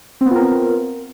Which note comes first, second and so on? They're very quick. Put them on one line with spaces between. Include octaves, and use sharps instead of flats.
C4 B3 F4 A#4